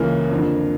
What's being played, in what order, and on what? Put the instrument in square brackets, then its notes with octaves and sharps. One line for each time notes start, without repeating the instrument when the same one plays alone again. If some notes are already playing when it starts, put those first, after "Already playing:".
Already playing: [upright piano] C#2 C#3 E3 A#3
F2 D3